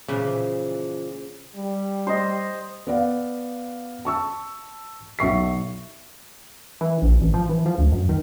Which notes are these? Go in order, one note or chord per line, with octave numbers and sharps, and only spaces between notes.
A#2 C#3 E3 F3
G3
C5 D#5
B3 D5 F5
A5 C#6 E6
B1 E5 C#6 C7
E3
A#1
A1
F3
E3
F3
D2
F#2
D#3